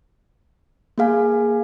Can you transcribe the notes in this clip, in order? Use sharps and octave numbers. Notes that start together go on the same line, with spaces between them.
A#3 G#4 F5 G#5